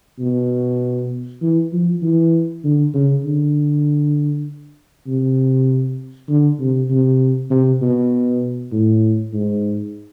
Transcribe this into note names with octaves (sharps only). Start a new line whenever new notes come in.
B2
E3
F3
E3
D3
C#3
D3
C3
D3
C3
C3
C3
B2
A2
G#2